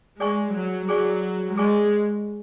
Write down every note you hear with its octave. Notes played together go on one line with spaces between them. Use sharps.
G#3 G#4 D5 G#5 C#6
F#3
F#3 G#4 D5 G#5 C#6
G#3 G#4 D5 G#5 C#6